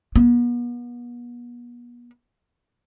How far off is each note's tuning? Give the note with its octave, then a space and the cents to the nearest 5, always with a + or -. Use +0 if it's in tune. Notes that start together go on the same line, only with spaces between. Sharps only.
B3 -40